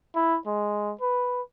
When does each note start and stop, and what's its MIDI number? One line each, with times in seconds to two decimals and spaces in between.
0.15 0.38 64
0.46 0.93 56
1.01 1.42 71